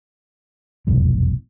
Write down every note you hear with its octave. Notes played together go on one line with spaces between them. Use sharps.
F1 B1 E2 G#2